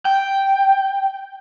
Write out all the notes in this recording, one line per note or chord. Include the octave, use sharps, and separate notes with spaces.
G5